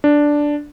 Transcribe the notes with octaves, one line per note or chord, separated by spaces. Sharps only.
D4